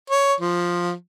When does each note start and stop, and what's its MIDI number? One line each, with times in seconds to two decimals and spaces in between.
0.10 0.34 73
0.40 0.92 53